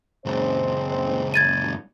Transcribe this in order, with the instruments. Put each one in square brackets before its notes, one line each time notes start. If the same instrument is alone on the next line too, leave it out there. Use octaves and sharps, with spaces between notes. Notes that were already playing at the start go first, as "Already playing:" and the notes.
[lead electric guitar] C#2 F#2 [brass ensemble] G#3 C4 C5
[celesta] G#6 A6 D#7